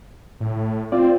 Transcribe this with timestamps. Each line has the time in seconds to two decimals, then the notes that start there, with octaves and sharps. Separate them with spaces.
0.40 A2
0.92 C4 F4 D5